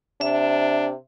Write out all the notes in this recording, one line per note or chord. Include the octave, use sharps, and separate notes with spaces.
C3 D4 E5